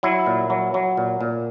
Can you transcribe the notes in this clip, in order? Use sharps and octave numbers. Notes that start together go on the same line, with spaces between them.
F#3 E4
A#2
F#3
F#3
A#2
A#2